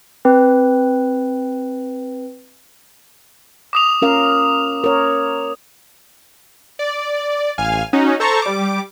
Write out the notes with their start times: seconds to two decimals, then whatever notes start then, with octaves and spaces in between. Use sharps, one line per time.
0.25 C4 B4
3.73 D6 D#6 F7
4.02 C#4 A#4 F5
4.84 A#4 C#5
6.79 D5
7.58 A1 F5 G#5 F6
7.93 C#4 D#4 F#4
8.20 A4 C5 A5 A#5 C#6
8.42 G3 D6